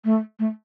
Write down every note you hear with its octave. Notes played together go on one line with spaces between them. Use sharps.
A3
A3